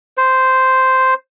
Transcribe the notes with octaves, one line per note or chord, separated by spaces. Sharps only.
C5